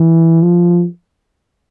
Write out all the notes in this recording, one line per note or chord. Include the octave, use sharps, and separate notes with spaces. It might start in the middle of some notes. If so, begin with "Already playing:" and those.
Already playing: E3
F3